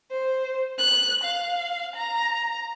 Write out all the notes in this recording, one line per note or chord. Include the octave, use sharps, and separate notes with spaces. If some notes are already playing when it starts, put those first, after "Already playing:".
C5
F#6
F5
A#5